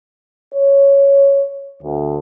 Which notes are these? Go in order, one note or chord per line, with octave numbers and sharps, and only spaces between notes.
C#5
D2